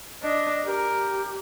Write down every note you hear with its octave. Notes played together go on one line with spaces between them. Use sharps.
D4 D#5
G4 A#4